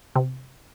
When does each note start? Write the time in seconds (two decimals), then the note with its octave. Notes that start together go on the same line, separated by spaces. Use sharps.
0.16 C3